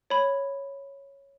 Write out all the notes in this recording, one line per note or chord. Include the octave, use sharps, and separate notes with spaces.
C#5 B5